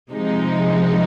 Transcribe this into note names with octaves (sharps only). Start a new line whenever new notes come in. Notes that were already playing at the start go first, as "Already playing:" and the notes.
C3 F3 G#3 D#4